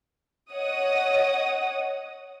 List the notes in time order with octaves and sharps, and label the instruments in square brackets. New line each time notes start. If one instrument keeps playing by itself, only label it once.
[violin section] C#5 D#5 F#5 D#6